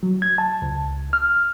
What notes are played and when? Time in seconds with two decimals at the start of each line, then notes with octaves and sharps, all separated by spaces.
0.03 F#3
0.22 G#6
0.38 A5
0.62 C#2
1.13 F6